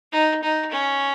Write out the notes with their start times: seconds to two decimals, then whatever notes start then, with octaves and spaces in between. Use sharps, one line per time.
0.12 D#4
0.43 D#4
0.71 C#4